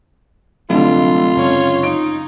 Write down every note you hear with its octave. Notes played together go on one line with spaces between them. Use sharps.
F1 D3 F#3 G3 A3 F4
F#2 C#3 G#3 C#4 C#5
D#4 D7